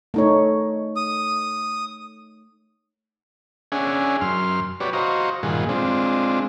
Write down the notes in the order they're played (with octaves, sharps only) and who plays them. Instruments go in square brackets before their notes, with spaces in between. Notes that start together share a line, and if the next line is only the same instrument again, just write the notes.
[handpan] A3 D#4 C#5
[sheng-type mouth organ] D#6
[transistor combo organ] C#4 D4 G#4 E5 F#5 G#5
F#2 C6 F6
F#4 G4 B4 C#5 D5
F#4 C5 D#5 F5 A#5 C#6
G2 A#2 D#3 F4 G#4 F#5
G#3 C4 D4 F4